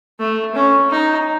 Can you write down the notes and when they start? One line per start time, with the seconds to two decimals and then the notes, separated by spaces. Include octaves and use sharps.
0.19 A3
0.55 C#4
0.90 D#4